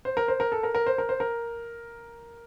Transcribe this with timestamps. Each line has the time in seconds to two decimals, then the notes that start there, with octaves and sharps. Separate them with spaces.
0.05 C5
0.17 A#4
0.28 C5
0.40 A#4
0.52 A4
0.63 A#4
0.75 A#4
0.87 C5
0.98 A#4
1.09 C5
1.20 A#4